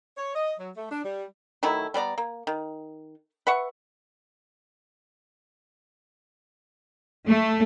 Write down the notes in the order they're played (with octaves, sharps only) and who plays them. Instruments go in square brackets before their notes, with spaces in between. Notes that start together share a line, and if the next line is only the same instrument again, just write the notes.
[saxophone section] C#5
D#5
F#3
A3
D4
G3
[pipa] D#3 F#3 A3 E4
G3 B3 D5 A#5
A#3
D#3
B4 E5 F#5 C#6
[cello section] A3